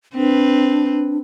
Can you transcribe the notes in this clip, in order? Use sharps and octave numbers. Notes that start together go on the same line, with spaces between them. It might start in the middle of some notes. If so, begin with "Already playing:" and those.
C4 D4 B4